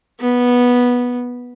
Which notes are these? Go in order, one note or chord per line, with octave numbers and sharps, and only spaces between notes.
B3